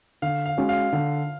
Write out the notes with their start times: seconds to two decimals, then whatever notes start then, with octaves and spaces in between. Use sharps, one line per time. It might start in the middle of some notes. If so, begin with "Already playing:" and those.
0.22 D3 F5
0.46 F5
0.57 G#3 C#4 F#4 C#5
0.69 F5
0.93 D3